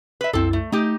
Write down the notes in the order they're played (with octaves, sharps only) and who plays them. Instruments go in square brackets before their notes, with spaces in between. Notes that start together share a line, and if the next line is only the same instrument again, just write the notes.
[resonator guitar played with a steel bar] B4 E5
[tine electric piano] C2 F#2 E4 [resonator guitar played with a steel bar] C4 A4
[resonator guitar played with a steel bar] A3
[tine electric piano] A3 [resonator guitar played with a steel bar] D#4 G4